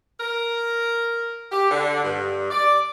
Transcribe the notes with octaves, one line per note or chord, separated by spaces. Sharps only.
A#4
G4
D3
G2
D5